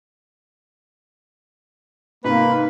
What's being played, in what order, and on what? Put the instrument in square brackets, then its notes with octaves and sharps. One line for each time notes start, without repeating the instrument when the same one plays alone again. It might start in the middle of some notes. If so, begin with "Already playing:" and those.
[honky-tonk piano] G#2 C3 [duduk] A#3 [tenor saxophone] B4